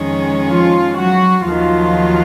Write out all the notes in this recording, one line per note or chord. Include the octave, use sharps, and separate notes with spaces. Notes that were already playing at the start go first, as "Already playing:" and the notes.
Already playing: F2 D#3 G#3 C#4 G#4
F3 F4
F#3 F#4
D#2 D#3 F3 F#3 F4